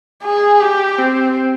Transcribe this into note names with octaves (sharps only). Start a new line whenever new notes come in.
G#4
G4
C4